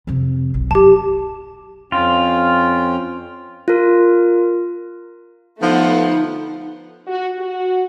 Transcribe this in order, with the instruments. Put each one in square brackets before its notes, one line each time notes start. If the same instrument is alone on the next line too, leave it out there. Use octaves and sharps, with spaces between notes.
[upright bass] F2 C3
B1
[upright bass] F#2 [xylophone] G4 A5
[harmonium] F2 C#4 G5 [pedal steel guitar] F4
[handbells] F4 A#4
[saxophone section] D3 F3 [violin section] A3 B3 F#5 [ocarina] D#4
[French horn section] F#4
F#4